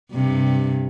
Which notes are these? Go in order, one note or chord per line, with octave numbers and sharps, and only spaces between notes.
G2 C3